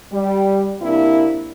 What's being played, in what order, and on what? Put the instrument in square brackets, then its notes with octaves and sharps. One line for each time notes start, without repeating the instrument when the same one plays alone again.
[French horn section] G3
C3 A#3 D4 E4